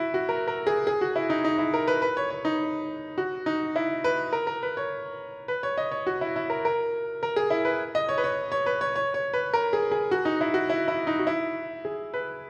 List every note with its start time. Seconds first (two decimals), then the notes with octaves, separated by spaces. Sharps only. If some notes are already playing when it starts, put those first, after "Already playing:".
Already playing: E4 F#4
0.14 F#4
0.29 A#4
0.47 A#4
0.67 G#4
0.87 G#4
1.01 F#4
1.16 E4
1.30 D#4
1.44 D#4
1.58 E4
1.74 A#4
1.87 B4
2.02 B4
2.17 C#5
2.30 C#5
2.45 D#4
3.18 F#4
3.46 D#4
3.76 E4
4.04 B4
4.32 A#4
4.47 A#4
4.63 B4
4.77 C#5
5.48 B4
5.63 C#5
5.78 D#5
5.91 C#5
6.06 F#4
6.21 E4
6.36 E4
6.50 A#4
6.65 A#4
7.23 A#4
7.36 G#4
7.50 E4
7.65 B4
7.95 D#5
8.09 C#5
8.18 B4
8.24 C#5
8.52 C#5
8.66 B4
8.81 C#5
8.96 C#5
9.14 C#5
9.33 B4
9.53 A#4
9.73 G#4
9.91 G#4
10.11 F#4
10.25 D#4
10.41 E4
10.54 F#4
10.70 E4
10.88 E4
11.07 D#4
11.19 F#4
11.27 E4
11.85 G#4
12.14 B4